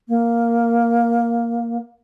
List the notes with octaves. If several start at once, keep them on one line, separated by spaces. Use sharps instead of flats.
A#3